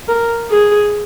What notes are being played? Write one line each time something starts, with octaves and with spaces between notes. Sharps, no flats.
A#4
G#4